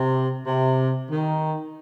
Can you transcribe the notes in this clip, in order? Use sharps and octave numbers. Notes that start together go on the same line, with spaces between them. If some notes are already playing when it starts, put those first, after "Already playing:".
Already playing: C3
C3
D#3